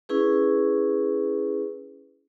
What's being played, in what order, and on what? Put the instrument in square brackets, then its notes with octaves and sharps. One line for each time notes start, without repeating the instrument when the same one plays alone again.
[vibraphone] C#4 E4 G#4 B4